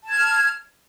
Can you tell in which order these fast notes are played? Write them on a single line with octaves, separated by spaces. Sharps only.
A5 G#6 F6